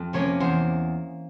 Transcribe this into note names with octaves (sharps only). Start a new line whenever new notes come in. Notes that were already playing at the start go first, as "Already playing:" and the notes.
Already playing: F2
C3 F3 A#3 C#4 C#5
E2 C5